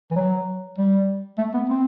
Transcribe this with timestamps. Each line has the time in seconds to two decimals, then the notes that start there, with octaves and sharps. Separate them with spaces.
0.11 E3
0.16 F#3
0.78 G3
1.38 A3
1.54 B3
1.70 C4